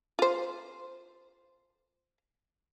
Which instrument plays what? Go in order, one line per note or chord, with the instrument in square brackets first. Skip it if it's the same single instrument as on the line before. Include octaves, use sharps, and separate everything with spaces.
[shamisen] F4 C5